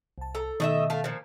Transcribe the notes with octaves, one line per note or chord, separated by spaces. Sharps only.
C2 A5
A4 A#5
B2 D#3 A3 D#5 E5
A3 F5
A#2 F3